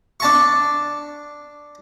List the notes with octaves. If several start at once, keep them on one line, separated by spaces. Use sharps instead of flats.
D4 A5 C#6